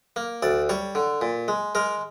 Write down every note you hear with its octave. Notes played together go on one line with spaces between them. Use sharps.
A#3
D2 D5
G3 C#5
D3
A#2
G#3
G#3 A#4